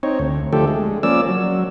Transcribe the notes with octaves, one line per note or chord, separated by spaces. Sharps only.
C4 D#4 C#5
D2
D3 F3 A3 G4 A4
G#3
F3 A#3 C#4 D5 E6
F#3